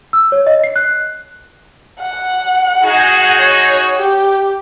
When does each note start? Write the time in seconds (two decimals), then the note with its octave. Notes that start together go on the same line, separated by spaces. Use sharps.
0.13 E6
0.32 C#5
0.47 D#5
0.64 C7
0.76 F#6
2.01 F#5
2.83 D#4 F#4 G#4
3.40 C#5
3.96 G4